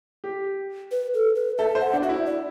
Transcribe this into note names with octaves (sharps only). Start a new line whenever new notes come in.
G4
B4
A4
B4
A4 E5
C5
F#5
D4
F#4 E5
E4
D5